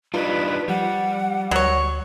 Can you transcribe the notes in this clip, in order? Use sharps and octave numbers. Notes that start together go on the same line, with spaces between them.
G3 D4 D#4 F4 B4
F3 G3 F#5
D2 F#3 C#5